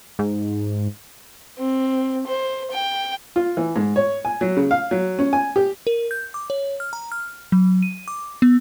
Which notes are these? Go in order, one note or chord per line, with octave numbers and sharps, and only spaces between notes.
G#2
C4
C5
G5
F4
E3
G#2
C#5
G#5
F#3
C#3
F5
F#3
C#4
G#5
G4
A#4
G6
D6
C#5
F6
A#5
F6
F#3
D#7
D6
B3